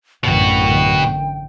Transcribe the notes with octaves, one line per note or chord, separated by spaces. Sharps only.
A1 F#2 B2 D3 F#4 G5